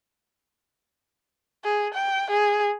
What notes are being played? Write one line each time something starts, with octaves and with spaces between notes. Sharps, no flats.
G#4
G5
G#4